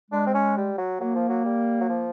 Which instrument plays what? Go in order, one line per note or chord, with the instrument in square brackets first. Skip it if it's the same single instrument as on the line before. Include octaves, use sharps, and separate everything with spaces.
[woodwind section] G#3 [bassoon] D4
[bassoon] C4
C#4
G3
F#3
[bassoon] F#3 [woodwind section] A#3
[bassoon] F3
F#3
G3
F#3
F3